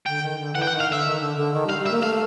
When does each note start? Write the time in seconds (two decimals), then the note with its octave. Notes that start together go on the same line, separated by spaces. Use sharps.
0.06 D3 G5
0.23 D#3
0.39 D3
0.55 E3 F#5
0.62 G5
0.68 F#5
0.72 D#3
0.80 F5
0.88 D3 E5
1.05 D#3
1.20 D3
1.37 D3
1.54 D#3
1.67 G3
1.70 F5
1.78 G3
1.86 E5
1.91 A#3
2.02 A3 F5